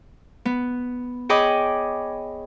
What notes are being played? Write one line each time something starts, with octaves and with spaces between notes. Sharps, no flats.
B3
G#4 C#5 D#5 G5 B5 D6